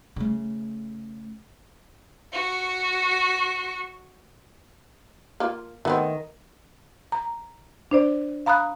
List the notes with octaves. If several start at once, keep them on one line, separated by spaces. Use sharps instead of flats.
C#3 A3
F#4 C#6
A#3 F4
D#3 A3 B3 C4
A#5
D4 C5 D5
F5 A#5 B5 D#6 F#6